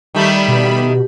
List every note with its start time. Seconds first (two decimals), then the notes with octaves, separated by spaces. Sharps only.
0.15 D#3 G3 A3 B5
0.48 B2 G4